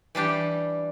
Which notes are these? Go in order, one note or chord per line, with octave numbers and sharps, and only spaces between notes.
E3 G3 D4 G4